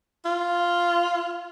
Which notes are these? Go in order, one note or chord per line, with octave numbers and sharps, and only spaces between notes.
F4